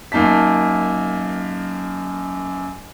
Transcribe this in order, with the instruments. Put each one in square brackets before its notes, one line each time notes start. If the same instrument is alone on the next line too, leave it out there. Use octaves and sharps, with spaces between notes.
[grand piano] F#2 A#3 D#4 A5 B6